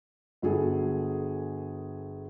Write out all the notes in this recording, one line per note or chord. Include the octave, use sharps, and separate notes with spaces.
G1 F#3 G#4 A4